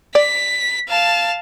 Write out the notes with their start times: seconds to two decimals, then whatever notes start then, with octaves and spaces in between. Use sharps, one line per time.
0.15 D5 B6
0.88 F5 A5